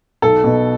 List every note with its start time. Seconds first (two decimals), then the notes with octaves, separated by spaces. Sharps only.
0.22 B1 A4
0.44 B2